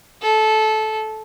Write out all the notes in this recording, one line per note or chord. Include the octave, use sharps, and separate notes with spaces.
A4